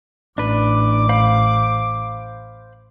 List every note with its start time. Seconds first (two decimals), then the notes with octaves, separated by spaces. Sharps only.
0.38 A1 D4 B4 D6
1.09 C5 F5 B5